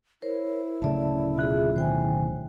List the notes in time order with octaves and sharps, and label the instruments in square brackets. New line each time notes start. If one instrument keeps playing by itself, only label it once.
[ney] E4 [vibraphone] A#4 C5 C#5
[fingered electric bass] D1 C#3 A3 [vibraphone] D5 E5 A5
[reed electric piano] B2 E5 F#6 [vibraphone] F4 G#4
[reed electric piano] B2 D#3 [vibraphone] C5 G5 G#5